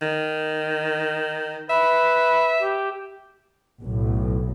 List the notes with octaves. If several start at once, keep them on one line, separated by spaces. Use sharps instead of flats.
D#3
B4 E5
G4
B1 A2